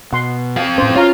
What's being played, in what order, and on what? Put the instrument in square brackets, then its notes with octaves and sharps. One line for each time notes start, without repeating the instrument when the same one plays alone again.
[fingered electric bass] B2 [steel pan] F#5 C6
[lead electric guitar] C4 F5
[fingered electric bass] A2 C#4 [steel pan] C5
[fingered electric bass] C#4 [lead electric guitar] F4 [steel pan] C#5 F5 A#5